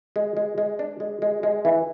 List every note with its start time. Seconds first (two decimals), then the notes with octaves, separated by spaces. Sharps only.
0.16 G#3
0.37 G#3
0.58 G#3
0.79 D4
1.00 G#3
1.22 G#3
1.43 G#3
1.65 E3